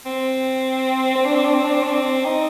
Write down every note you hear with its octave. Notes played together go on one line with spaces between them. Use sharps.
C4
C4
D4
C4
D4
C4
D4
C4
D4
C4
D#4